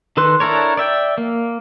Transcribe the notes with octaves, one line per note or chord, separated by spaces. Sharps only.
D#3 A4 B4 C6 F#6
D4 E4 A4 A#4 C#5
D5 E5 G5
A#3